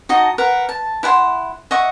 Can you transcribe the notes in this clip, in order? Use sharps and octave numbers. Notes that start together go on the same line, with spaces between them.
D#4 F#4 D#5 A5
A#4 B4 F#5
A5
E4 F#5 G#5 C6
D#5 E5 F#5 C#6